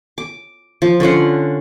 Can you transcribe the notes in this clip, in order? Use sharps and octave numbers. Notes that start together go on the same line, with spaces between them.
D6
F3
D3 C#4 F4 F#5